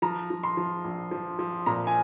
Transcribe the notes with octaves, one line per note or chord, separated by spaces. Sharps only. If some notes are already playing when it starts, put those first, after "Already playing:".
F3 A#5
F3
C6
F3
A#1
F3
F3
A#2 A#5
G#5